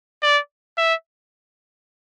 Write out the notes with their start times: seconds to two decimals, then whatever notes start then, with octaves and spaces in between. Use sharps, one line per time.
0.23 D5
0.78 E5